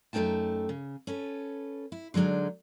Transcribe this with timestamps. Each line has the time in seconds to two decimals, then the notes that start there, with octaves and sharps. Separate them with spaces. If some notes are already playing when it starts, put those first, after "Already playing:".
0.13 F#2 A3 C4 D#4 G5 A5
0.69 C#3
1.07 C#4 A4 B4
1.92 E4
2.14 D3 F#3 G#3 D4 D#4